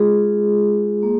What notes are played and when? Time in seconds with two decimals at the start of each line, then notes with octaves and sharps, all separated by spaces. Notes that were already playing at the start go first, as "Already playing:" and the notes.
Already playing: G#3 F4 G#4
1.03 A#3